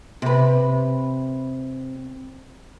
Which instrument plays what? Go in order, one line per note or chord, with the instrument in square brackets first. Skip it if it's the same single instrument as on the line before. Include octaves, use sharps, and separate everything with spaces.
[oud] C3 B4